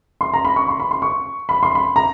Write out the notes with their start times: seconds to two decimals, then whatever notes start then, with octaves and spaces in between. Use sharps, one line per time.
0.21 C6
0.33 A#5
0.45 B5
0.56 C#6
0.68 C6
0.80 B5
0.91 C6
1.02 C#6
1.49 B5
1.63 C6
1.75 B5
1.96 A#5